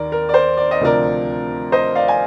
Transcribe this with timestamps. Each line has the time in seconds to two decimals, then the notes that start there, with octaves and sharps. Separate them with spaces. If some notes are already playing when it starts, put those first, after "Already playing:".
Already playing: D#2 D#3 A#4 D5
0.12 A#4
0.29 D5
0.34 C5
0.57 D5
0.71 D#5
0.80 D2 C3 F3 A#4 D5
1.72 C5 D#5
1.95 D5 F5
2.08 G#5